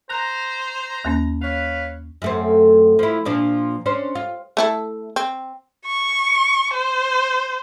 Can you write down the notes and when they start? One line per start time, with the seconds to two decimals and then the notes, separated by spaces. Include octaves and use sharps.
0.10 C5 A#5 F#6
1.05 D#2 A#3 C#4
1.42 B4 C#5 F5
2.22 F#2 A3 C4
2.99 F3 E4
3.25 A#2 F3 D4
3.86 C#4 D4 C5
4.15 F4
4.57 A3 E4 A4
5.16 C4
5.86 C#6
6.74 C5